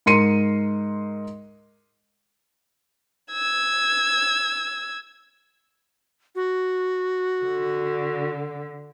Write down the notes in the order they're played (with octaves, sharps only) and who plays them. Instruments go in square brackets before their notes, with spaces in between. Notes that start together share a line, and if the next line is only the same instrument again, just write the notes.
[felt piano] G#2 A#4 C6 C#7 D#7
[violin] E6 G#6
[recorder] F#4
[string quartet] D3